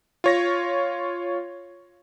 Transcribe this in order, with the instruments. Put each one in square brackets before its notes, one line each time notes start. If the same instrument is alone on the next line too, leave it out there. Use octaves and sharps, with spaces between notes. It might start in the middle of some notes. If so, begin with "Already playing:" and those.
[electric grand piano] F4 C#5 A#6